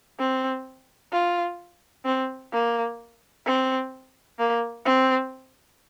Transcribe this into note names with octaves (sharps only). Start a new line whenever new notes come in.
C4
F4
C4
A#3
C4
A#3
C4